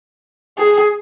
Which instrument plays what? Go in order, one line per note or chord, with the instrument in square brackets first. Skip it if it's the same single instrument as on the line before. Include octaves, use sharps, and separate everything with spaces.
[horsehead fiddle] G#4